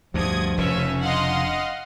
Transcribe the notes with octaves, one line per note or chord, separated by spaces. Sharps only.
D2 G2 F3 D#6 G#6
F1 C#3 C#4 E5
D4 D#5 F5 F#5 C6